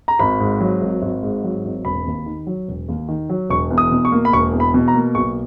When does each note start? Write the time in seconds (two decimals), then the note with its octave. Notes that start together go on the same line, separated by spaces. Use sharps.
0.08 A#5
0.19 G#1 B5
0.40 G#2
0.60 F#3
0.82 G#1
1.02 G#1
1.23 G#2
1.44 F#3
1.65 G#1
1.85 E1 B5
2.06 D#2
2.26 D#3
2.47 F#3
2.68 E1
2.88 D#2
3.08 D#3
3.29 F#3
3.50 E1 C#6
3.71 E2
3.78 D#6
3.91 B2
4.05 C#6
4.12 A#3
4.25 B5
4.33 E1 C#6
4.53 E2
4.60 B5
4.74 B2
4.88 A#5
4.95 A#3
5.15 B1 C#6